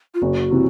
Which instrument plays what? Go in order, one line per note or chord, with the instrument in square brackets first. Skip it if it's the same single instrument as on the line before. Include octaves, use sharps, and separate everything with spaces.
[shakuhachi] F4
[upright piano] F#1 [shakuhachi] F#4
[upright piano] C3 E3